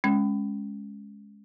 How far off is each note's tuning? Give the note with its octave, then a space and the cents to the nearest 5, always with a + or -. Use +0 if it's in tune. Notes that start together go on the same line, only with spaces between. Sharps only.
G#3 +0 C#4 +0